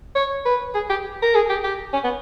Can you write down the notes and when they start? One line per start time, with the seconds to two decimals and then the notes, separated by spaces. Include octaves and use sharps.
0.16 C#5
0.46 B4
0.75 G#4
0.90 G4
1.22 A#4
1.35 G#4
1.49 G4
1.64 G4
1.93 C#4
2.04 B3